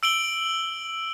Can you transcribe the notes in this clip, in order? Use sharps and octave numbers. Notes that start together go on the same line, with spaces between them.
E6 D7 F#7 G7